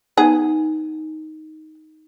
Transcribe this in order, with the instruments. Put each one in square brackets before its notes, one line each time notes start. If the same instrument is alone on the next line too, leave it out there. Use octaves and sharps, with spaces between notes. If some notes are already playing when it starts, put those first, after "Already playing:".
[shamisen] B3 G#4 [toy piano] D#4